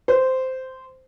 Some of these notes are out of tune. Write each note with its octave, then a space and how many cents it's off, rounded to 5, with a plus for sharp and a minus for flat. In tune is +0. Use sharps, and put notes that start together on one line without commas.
C5 -10